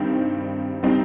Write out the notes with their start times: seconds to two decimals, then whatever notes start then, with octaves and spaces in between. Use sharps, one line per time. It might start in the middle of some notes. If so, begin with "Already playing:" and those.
Already playing: G2 D#3 G3 C4 D#4
0.83 G3 C4 D#4